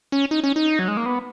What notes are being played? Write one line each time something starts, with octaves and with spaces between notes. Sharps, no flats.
C#4
D#4
C#4
D#4
F#3
G#3
A#3
B3